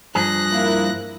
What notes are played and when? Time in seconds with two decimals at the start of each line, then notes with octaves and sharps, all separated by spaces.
0.15 G2 F3 G#4 F#6 A#6
0.52 A#3 E4